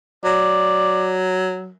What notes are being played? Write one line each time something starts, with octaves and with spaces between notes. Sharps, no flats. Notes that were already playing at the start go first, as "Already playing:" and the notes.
F#3 D5